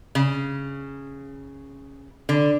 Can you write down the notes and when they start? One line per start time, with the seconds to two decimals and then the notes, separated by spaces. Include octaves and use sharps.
0.15 C#3
2.29 D3